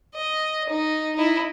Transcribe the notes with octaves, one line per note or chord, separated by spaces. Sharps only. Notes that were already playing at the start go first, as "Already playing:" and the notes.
D#5
D#4
D#4 E4